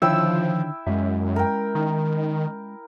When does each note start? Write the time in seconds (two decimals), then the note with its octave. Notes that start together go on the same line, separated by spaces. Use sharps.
0.02 D3 D#3 F3 E4 C#5 G5 E6
0.87 F#2 G#3 C#4 E5
1.36 A#4 G5
1.75 D#3